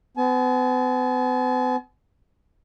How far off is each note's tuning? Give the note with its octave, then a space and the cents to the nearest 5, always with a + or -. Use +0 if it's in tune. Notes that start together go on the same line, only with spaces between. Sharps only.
B3 +45 G#5 +45